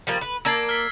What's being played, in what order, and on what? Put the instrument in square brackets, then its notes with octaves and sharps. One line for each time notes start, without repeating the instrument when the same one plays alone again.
[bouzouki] F3 G3 A#3
B4
[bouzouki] A#3 D5 A5 [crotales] E6 G#6 C7
[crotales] F6 B6